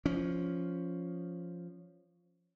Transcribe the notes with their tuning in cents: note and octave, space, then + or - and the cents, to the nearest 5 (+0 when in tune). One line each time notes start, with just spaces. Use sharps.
F3 +0 C#4 +5